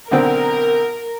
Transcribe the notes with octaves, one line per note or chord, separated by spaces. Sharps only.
B1 D3 C4 A#4